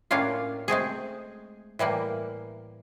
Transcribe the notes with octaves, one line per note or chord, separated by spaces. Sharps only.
A2 A#3 C#4 D4 F4 F5
G#3 A3 C4 G#4
A2 E3 G3 A#3